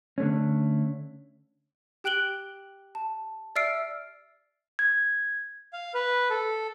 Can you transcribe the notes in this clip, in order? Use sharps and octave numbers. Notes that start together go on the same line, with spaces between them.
D3 A3 C#4
G4 G5 F#6 D7 F#7 G7
A5
D5 E5 E6 F6 C7 D7
G#6
F5
B4
A4